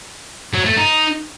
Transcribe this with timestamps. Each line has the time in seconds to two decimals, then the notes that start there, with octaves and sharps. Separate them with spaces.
0.54 F#3
0.65 A3
0.76 D#4